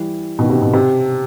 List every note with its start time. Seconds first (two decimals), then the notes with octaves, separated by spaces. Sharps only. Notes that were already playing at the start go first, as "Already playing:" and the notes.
Already playing: E3 G3
0.39 B2 D#3
0.50 C3
0.62 B2
0.73 C3